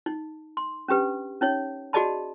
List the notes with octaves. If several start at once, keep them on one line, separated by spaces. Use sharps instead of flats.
D#4
C6
C#4 D4 G4 B4
C#4 D#4 C#5
F#4 G#4 D5 D#5 A5 B5